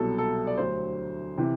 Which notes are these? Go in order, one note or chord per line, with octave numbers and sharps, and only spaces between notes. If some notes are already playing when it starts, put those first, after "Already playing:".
Already playing: C2 B2 F#3 A4
A4
D5
D2 D3 F#3 C5
C3 E3